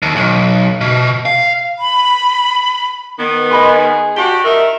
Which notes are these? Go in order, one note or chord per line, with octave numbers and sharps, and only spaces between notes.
D#2
B1
B2
F5
B5
D#3 B3
G#4 D#5 B5 C6
D4 F#4 G4 G7
D#3 A#4 E5